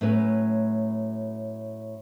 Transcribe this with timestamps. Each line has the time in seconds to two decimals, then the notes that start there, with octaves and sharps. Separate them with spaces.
0.01 A2 F#3 A3 C#4 B4 C#5